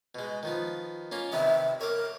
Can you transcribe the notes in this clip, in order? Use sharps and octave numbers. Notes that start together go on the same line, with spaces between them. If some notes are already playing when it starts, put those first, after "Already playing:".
B2 G#3
D#3 F3 B3
A#3 C#4 F4
C3 D#3 B3 E5
A#4 C#5 D6